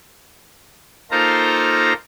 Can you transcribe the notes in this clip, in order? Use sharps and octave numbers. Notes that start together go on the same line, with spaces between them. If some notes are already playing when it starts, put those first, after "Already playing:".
A#3 D#4 F4 A4 C5 A#5